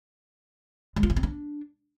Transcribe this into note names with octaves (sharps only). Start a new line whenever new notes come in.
G#3
F4
B3
C4
D4